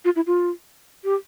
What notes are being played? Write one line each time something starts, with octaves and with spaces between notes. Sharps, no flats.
F4
E4
F4
G4